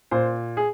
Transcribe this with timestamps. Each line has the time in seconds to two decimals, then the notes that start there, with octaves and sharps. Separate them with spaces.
0.11 A#2 C5
0.57 G#4